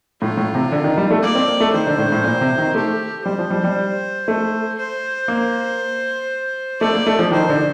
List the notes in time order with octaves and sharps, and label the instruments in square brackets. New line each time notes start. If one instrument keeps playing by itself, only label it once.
[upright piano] A2 [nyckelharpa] F4
[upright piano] A2
C3
D3
D#3
G3
A3
[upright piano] A#3 [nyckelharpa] D5
[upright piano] C4
A#3
A3
[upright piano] D#3 [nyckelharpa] C5
[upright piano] D3
A2
A2
A#2
C3
D#3
[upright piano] A3 [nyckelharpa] G4
[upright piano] G3 [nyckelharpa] C5
[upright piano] F3
G3
G3
A3
[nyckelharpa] C5
[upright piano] A#3
[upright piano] A3 [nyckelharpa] D5
[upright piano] A#3
A3
F3
[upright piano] D#3 [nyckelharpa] C5
[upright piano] D3